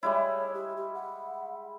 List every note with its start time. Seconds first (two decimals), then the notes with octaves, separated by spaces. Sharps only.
0.03 G3 G#3 E4 C#5
0.54 G4
0.77 G4
0.94 F#5